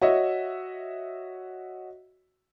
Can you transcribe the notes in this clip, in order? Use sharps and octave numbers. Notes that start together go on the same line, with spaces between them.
F#4 C#5 D#5 E5